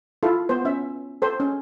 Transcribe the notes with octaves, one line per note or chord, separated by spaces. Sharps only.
E4 F4 A4
B3 C5
C#4 E5
A4 C5
C#4